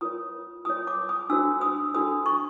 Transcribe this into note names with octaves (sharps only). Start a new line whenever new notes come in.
F4 A#4 C#5 D#6
F4 A#4 C#5 D#6
D6
D#6
D4 F#4 A4 C5 E6
D#6
D4 F#4 A4 C5 D#6
C#6